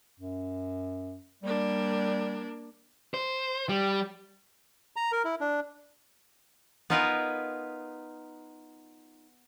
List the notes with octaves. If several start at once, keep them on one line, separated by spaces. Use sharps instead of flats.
F#2
G3 A#3 D4
C5
G3
A#5
A#4
E4
D4
B3 D#4 F4 A#4 B4 G#5